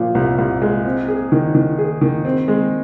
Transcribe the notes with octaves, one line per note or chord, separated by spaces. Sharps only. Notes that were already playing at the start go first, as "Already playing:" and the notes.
Already playing: A#2 F3
C2
C2
G#3
C4
G#4
D#3
D#3
G#4
D#3
C4
G#3